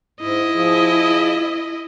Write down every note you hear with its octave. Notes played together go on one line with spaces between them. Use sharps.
G#2 E4 D#5
F3 G#4